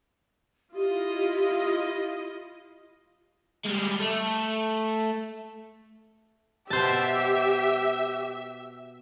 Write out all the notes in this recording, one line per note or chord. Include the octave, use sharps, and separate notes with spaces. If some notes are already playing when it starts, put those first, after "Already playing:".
E4 F4 G4 D#5
G3 G#3
A3
B2 G4 C5 E5 A5